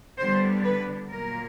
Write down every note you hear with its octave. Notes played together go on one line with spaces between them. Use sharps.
D3 G3 B3 D4 C5
B4
A#2 F#3 A#3 A#4